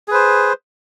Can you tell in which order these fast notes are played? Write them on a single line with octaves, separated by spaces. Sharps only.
G#4 B4 C5